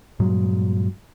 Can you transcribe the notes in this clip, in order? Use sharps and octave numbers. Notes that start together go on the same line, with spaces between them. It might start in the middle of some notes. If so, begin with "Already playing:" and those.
G2 A#2 F#3 G#3